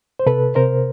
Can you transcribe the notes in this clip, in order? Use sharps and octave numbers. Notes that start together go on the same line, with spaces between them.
C5
C3 A4 B4
C3 A#4 C5